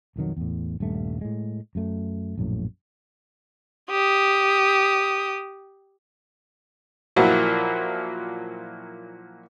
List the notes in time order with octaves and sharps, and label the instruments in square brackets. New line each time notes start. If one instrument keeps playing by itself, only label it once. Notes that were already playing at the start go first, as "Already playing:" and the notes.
[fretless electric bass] B1 F2 D#3 F#3
E2 A2
D#1 G2 A3
A2 G#3
F#2 A3
A#1 F#2 A2
[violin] G4 D#6
[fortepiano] A#2 F3 F#3 A#3 E4 F#4